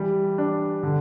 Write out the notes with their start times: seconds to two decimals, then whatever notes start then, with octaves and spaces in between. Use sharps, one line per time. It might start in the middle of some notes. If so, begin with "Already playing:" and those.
Already playing: E3 G3
0.38 D4
0.83 D3